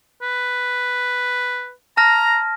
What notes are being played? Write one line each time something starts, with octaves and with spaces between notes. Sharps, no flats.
B4
A5 A#5 F6 A#6